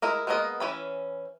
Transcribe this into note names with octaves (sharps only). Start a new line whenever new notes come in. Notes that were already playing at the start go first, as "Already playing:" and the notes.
G#3 E4 A#4 D#5
G#3 A#3 B3 A#4 D#5
E3 C#4 B5